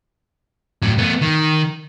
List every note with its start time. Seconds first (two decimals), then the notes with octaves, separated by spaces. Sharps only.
0.82 A2 F#3
0.98 A3 B3
1.22 D#3